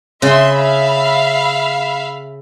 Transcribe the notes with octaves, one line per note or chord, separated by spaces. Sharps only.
C#3 E5 C6
E5 F5 B5